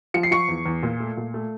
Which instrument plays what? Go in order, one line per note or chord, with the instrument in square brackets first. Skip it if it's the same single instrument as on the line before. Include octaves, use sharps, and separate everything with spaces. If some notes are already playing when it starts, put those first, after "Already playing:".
[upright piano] F3 C#7
C7
F3 C#6 C#7
E2
E2
A#2
A3
A#2
A3